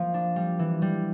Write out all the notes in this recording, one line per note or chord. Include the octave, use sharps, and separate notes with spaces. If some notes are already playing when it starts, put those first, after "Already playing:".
Already playing: F3 A#3
D4
G3
E3
G3